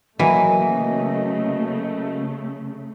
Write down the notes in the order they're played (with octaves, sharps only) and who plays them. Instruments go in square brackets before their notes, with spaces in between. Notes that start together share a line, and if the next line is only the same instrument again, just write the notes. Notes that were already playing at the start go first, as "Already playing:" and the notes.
[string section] C#3 A3 [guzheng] E3 [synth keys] F#3 A#3 [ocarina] D#5